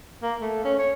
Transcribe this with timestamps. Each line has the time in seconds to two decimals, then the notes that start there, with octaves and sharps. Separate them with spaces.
0.23 A#3
0.41 A3
0.64 C#4
0.79 C#5